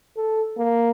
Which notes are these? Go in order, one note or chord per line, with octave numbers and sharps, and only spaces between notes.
A4
A#3